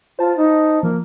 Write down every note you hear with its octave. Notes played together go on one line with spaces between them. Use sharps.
F4 C5 A5
D#4
F3 A#3